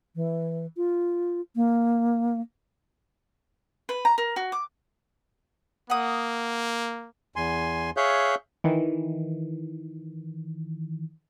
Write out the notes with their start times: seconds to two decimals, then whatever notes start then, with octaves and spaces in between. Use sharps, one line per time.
0.15 E3
0.77 F4
1.56 A#3
3.89 B4
4.05 A#5
4.18 A#4
4.36 F#4
4.52 D6
5.90 A#3 F#5 D#6
7.36 E2 G#5 C6
7.97 G#4 C#5 E5 F5 F#6 G6
8.64 D#3 E3